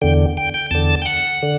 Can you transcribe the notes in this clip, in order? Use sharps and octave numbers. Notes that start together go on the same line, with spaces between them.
E2 D3 G5
G5
G5
E2 D3 A5
G5
F#5
D3